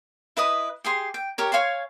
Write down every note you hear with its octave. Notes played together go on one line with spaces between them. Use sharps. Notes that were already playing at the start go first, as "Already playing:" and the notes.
E4 B4 D#5 D#6
G4 G#4 C6
G5
G4 A#4 C#5
C#5 F5 G#5 C6